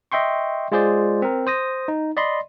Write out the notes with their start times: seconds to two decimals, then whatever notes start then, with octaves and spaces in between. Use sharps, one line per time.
0.12 D#5 E5 G5 C6 C#6
0.72 G#3 F4 G#4 C5 D5
1.22 C4 A#4
1.47 C5 D#6 A#6
1.88 D#4
2.17 D5 D#5 B5 C6